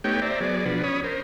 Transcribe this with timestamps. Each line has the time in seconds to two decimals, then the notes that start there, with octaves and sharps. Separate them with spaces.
0.04 A3 B3 D#4 G4 C#5 G5
0.22 C5 D5 E5 A#5
0.40 F#3 B3 G#4 D5
0.65 B2 F3 D4 F#4 B4
0.84 C#4 C#5 B5 D#6
1.04 A#4 C5